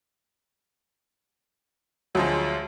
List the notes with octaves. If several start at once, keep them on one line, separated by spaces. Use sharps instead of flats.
D2 F3 F#3 G#3